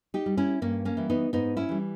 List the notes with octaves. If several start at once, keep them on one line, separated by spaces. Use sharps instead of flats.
D#4 G4
G3
C#4 E4
G2 A#3 C#4
A#3 C#4
E3 G3
B3 D#4
G#2 B3 D#4
C#4 E4
E3 G3